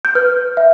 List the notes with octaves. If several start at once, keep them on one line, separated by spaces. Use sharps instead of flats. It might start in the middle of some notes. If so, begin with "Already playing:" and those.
G6
B4 F6
E5